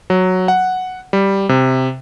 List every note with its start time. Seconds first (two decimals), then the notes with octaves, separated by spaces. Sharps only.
0.10 F#3
0.48 F#5
1.13 G3
1.49 C3